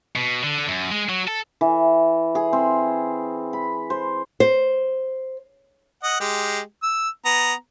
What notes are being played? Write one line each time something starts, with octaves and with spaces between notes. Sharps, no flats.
B2
D3
F#2
G#3
F#3
A4
E3
G#4
C4
B5
C5
C5
D#5 F#5
G#3 G4
E6
B3 A#5